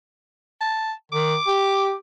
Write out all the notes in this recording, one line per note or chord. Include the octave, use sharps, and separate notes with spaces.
A5
D#3 D6
G4